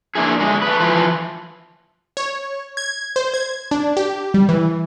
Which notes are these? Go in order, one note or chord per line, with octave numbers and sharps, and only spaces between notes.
A#3 D4 E4 G#4
D3 G#3
A3 B4
E3 F3 F4 B4
C#5
G#6
C5
G#6
D4
G4
G3
E3